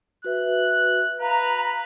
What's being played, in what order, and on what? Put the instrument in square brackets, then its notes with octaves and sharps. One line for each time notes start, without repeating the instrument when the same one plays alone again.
[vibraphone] F#4 B4 E5 [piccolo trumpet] F#6
[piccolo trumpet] B4 [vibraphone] F5 [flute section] A#5